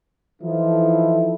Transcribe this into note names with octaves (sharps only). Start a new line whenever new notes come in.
E3 F3 D#4 E4 A4